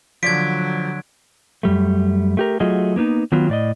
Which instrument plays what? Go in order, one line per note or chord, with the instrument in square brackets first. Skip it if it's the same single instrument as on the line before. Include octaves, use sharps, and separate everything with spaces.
[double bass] D3 F#3 [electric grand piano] F3 D5 [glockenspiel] G#6 D7 [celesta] B6
[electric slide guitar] F#2 G3 A3
A3 G4 A#4
F#3 A3 F4 F#4 G#4 D#5
A#3 B3 D4 D#4
D#3 F#3 B3 F4
A2 D5 D#5